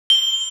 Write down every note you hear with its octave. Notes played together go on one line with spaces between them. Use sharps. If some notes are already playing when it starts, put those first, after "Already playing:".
G7